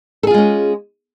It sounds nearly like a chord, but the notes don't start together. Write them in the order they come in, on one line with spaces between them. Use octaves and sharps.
A4 G#4 F4 G#3 C#4